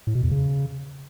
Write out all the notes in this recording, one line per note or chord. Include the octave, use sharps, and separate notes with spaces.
A2
B2
E2
C#3